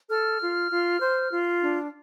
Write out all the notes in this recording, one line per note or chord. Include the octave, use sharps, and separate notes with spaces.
A4 F6
F4
F4
C5
F4
D4